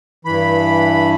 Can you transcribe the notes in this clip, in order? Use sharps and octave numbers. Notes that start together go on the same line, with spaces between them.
G2 E3 B5